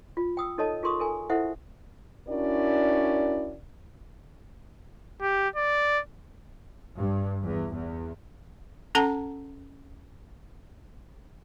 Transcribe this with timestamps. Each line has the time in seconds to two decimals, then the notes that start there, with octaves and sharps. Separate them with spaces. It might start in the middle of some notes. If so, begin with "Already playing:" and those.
0.17 F4
0.37 G5 D#6 E6
0.58 D#4 A4 C#5 D#5 A5
0.83 F4 G#4 A#4 C6 C#6 D#6
0.99 A4 A#4 G#5 A#5
1.30 E4 A4 C5 E5 F#5
2.28 C#4 D4 E4 F#4 A#4 D5
5.22 G4
5.56 D5
6.97 G2
7.44 E2
7.76 E2
8.95 C#4 A4 F#5 A5 A#5